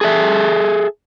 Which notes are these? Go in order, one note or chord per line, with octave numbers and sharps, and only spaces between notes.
G#4 A4 E5